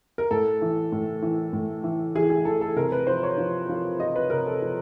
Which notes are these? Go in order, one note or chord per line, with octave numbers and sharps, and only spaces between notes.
A#4
A2 A4
E3
A2
E3
A2
E3
E3 G#4
G#4
E3 A4
A4
C3 A#4
B4
F3 C5
C#5
F3
F3
F3 D#5
B4
C3 A#4
A4
F3